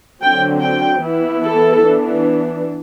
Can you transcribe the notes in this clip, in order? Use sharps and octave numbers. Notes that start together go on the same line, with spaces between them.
D3 F#3 C4 G5
G5
E3 B3 E4
A4
E3 B3 D4